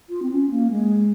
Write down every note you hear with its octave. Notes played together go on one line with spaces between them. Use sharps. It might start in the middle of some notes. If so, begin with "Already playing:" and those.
F4
C4
C#4
A#3
G#3